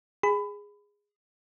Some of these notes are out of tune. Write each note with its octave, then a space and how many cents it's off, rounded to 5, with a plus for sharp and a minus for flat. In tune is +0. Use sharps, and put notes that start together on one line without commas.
G#4 -10 B5 +25